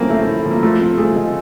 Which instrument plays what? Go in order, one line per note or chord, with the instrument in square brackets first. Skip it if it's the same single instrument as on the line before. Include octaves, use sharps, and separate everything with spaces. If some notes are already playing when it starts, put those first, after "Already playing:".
Already playing: [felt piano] F3 A3 C#4 E4 [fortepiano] A#3 C4
[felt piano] A3
E4
F3
[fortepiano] A#3
[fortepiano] A3 [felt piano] F4
[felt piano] C4
[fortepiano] A3 [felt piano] G#4
[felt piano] G#3